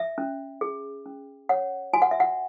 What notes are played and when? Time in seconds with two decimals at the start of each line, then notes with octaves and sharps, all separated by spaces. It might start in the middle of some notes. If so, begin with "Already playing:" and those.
Already playing: E5
0.18 C#4
0.61 G#4
1.06 C#4
1.49 C#5 F#5
1.93 F#4 G#5
2.02 F#5
2.11 E5
2.20 F#5